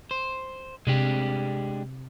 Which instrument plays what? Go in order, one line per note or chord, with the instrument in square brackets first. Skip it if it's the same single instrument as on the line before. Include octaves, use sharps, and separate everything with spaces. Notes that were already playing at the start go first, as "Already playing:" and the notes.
[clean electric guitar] C5
[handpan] C3 [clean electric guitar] G#3 D4 G4